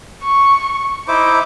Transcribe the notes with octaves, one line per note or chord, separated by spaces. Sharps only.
C#6
D#4 E4 C5 D6